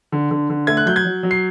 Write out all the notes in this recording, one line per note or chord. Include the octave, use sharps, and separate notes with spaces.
D3
D3
D3
A3 G#6
F#6
F#3 G6
G#6
F#3
F#3
C7